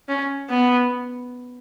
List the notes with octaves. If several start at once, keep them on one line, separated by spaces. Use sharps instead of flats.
C#4
B3